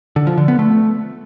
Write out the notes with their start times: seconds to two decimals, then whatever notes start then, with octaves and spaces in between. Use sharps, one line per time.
0.16 D3
0.27 F3
0.37 D3
0.48 B3
0.59 A3